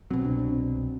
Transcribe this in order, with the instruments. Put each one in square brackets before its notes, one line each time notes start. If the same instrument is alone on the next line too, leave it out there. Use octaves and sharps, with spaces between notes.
[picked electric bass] C2 B2 F#3 [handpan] C4
[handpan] D4
C4